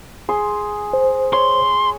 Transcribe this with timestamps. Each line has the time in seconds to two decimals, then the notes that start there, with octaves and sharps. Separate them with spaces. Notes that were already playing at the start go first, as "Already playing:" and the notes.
0.29 G#4 C6
0.93 C5
1.33 C#5 C6